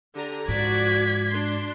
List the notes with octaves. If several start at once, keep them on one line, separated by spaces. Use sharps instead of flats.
D3 G4 A#5
G#2 F3 F#4 D5 G#6 B6
D4 C6